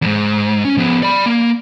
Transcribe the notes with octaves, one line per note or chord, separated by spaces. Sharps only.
E2 G#2
C#4
F3 B3
D5 B5
A#3